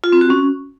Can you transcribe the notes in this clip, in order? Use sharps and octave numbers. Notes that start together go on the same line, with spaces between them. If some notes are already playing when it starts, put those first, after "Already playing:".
F4
C4
F#4
C#4